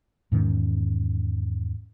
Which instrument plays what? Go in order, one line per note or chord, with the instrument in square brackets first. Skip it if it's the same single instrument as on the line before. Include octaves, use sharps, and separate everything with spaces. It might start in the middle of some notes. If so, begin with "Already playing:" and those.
[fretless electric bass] E2 G#2 D#3 C#4